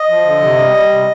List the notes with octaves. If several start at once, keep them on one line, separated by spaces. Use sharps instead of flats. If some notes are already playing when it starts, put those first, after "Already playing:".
Already playing: D#5
F3
D3
C3
G3
G3
C3